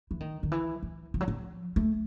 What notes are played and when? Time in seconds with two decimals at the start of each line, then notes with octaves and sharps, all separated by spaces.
0.11 E3
0.20 D#3
0.43 D#3
0.52 E3
0.83 E3
1.14 F3
1.21 F#3
1.28 F3
1.76 A3